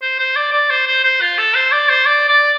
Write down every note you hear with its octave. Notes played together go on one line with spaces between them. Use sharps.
C5
C5
D5
D5
C5
C5
C5
F4
A4
C5
D5
C5
D5
D5